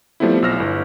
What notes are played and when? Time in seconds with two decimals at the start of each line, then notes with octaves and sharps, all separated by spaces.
0.20 F3 G3 A3 B3 C4 E4
0.42 B1 E6 F6 A#6
0.57 G1 E4